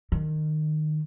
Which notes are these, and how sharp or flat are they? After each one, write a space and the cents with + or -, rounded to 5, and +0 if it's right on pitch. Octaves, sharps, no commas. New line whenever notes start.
D#3 -20